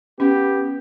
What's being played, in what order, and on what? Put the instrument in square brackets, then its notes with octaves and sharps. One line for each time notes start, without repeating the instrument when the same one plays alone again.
[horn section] B3 G4 [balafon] C#4